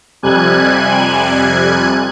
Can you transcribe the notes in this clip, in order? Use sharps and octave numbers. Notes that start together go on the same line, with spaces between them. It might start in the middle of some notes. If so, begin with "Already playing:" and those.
F2 C3 G3 G#5 F#6 G#6